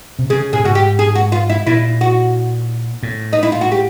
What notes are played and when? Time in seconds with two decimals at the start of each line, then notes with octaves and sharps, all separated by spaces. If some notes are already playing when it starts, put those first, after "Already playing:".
0.19 C3
0.30 C#3 G#4
0.53 A2 G#4
0.64 G#2 F#4
0.75 G4
0.99 G#4
1.15 F#4
1.32 F4
1.50 E4
1.67 A#2 E4
2.01 F#4
3.03 A2
3.33 D#4
3.43 E4
3.52 F4
3.61 F#4
3.72 G4